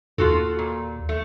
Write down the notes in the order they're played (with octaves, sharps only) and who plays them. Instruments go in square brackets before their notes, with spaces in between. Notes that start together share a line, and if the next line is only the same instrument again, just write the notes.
[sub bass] D#2 [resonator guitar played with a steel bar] F4 F#4 A4
[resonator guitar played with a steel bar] A#2
A3